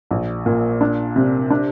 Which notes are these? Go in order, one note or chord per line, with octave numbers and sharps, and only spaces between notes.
A#1
A#2
D4
C3
D4